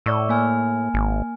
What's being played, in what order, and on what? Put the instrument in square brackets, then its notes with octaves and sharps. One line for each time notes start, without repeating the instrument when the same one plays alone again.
[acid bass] A2 [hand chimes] D5 C#6 E6
[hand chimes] A#3 G#5 F6
[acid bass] G#1